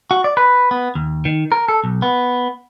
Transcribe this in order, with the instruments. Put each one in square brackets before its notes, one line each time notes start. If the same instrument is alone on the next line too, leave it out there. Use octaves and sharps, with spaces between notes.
[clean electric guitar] F#4
D5
B4
B3
D#2
D#3
A#4
A4
B1
B3